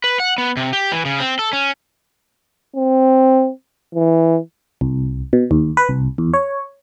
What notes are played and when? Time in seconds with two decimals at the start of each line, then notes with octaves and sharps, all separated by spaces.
0.04 B4
0.20 F#5
0.38 B3
0.57 C3
0.73 G4
0.92 E3
1.05 C#3
1.20 C4
1.39 A4
1.53 C#4
2.76 C4
3.95 E3
4.81 C2
5.33 B2
5.51 D#2
5.77 B4
5.89 C2
6.18 E2
6.34 C#5